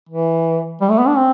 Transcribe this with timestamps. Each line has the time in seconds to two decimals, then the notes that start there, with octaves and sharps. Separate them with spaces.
0.09 E3
0.81 G3
0.90 A3
0.99 B3
1.08 D4
1.17 C4